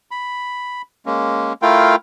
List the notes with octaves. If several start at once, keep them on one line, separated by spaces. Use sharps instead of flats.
B5
G#3 A#3 C#4
A3 E4 F4 A#4 F5 G5